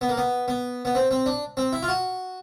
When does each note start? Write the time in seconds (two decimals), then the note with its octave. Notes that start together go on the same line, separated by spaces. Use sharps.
0.01 B3
0.09 A#3
0.17 B3
0.48 B3
0.85 B3
0.95 C4
1.11 C4
1.26 D4
1.57 C4
1.73 E4
1.83 F4
1.88 F#4